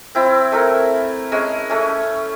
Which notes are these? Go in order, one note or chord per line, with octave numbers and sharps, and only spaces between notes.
C4 E4
A3 A#4
G#3 C#4
A3 C#4